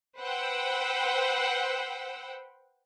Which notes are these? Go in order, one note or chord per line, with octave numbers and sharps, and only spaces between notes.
B4 C5 F#5 G5 E6